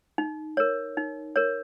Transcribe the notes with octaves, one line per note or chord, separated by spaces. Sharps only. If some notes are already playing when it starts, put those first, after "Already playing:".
D#4
A#4 C#5
D#4
A#4 C#5